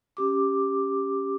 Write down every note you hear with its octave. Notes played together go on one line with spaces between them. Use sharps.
C#4 G4 D6